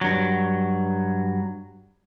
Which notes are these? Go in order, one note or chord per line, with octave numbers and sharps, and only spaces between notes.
G2 F#3